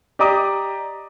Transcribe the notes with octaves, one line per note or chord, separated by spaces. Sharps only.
G4 D5 D#5 A#5 D6 D#6